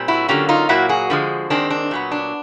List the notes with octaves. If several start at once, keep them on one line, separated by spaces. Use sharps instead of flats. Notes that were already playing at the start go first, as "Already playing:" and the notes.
Already playing: A#2 G3 C4
E4 F#4
D3 F#3 A#3 C#4 F4 G4
D#4 F4
A#2 F#3 A#3 E4 F#4
F#4 G#4
D3 F3 G#3
D#3 G#3 C4 D4
D4
A#2 F#3 B3
D4